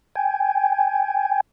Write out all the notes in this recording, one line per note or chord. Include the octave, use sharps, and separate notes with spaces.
G5 G#5